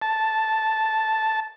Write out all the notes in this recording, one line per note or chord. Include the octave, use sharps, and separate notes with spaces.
A5